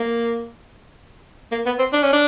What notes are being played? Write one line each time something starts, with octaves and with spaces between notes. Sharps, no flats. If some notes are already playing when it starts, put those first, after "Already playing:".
Already playing: A#3
A#3
B3
C4
D4
C#4
D4